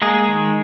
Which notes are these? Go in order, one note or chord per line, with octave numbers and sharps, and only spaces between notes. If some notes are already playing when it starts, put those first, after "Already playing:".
G#3 A#3 G#4
D#3